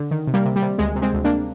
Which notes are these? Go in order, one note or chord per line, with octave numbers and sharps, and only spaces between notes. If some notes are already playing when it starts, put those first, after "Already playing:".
Already playing: D3
D#3
C3
G3 A#3
C3
G3
C3
D2 G#3
C3
G#3 C4
D2
A#3 D4